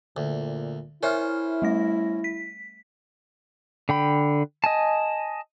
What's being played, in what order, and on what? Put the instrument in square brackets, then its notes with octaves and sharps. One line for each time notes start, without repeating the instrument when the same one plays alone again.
[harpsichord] D2 [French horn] A#2
[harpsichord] C#4 C5 [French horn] E4 [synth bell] A#4 E5 F6
[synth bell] G3 A3 A#6
B6
[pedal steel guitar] D3 G5 B5
D#5 G#5 A5